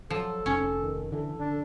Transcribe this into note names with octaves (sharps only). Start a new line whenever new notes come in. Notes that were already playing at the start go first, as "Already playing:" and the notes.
F3 F#3 A4
F1 C#4
D#3
D3 E3 A4
D3 D4